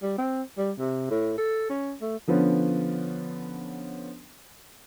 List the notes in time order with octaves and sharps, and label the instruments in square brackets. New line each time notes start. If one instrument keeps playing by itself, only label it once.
[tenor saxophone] G3
C4
G3
C3
A2
A4
C#4
A3
[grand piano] D3 F3 B3 C#4